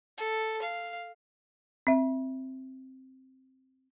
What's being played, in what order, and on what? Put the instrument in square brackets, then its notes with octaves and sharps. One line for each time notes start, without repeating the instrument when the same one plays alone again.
[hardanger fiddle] A4
F5
[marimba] C4 E5